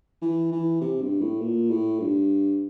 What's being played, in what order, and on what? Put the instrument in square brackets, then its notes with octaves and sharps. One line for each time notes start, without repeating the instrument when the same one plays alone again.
[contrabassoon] E3
E3
C3
G2
A2
A#2
A2
G2